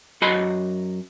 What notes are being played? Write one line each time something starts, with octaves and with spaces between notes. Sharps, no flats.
F#2 F#4 D#5 B5 C6